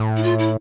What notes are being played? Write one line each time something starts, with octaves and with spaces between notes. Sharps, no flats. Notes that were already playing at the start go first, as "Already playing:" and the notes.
Already playing: A2
E4
F4
E4